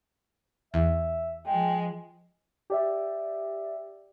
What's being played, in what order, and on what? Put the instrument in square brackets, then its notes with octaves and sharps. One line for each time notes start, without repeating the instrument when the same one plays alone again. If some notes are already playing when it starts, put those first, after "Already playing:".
[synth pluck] E2 [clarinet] E5
[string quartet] F3 G#3 [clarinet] G5
[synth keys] G4 D5 E5